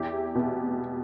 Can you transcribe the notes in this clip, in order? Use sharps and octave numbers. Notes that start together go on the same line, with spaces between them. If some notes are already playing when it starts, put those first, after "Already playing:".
Already playing: E2 E4 G4
B2